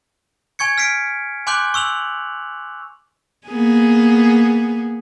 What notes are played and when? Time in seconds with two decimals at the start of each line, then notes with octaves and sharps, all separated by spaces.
0.59 G#5 C#6 G#6 C#7
0.78 F6 B6 C7 D7
1.47 G#5 C6 D6 F#6 G6 F#7
1.74 C#6 E6 F7 F#7
3.47 A#3 B3 G#4